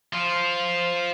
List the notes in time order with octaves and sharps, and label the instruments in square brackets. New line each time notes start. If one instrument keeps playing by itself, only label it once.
[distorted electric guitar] F3 F4